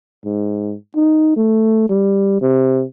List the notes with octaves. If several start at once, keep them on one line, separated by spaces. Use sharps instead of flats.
G#2
D#4
A3
G3
C3